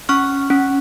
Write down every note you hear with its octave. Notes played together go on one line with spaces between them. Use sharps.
C#4 C#6 F6
C#4